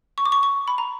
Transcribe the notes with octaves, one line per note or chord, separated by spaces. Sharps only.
C#6
D6
C#6
C#6
B5
A#5